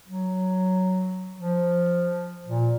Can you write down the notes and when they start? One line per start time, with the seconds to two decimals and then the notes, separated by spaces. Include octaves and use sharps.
0.08 F#3
1.40 F3
2.46 A#2